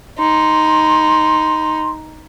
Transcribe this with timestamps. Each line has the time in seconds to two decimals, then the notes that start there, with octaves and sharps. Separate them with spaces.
0.18 D#4 C6